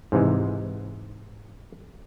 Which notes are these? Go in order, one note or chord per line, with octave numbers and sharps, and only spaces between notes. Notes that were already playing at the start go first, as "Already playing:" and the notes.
G#2 C3 E3 G#3